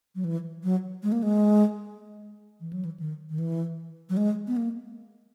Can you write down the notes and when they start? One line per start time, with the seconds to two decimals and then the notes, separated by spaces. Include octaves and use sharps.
0.15 F#3
0.24 E3
0.64 F#3
1.03 G#3
1.12 A#3
1.23 G#3
2.61 E3
2.73 F#3
2.85 E3
3.00 D#3
3.30 D#3
3.39 E3
4.09 F#3
4.17 G#3
4.47 B3
4.57 A#3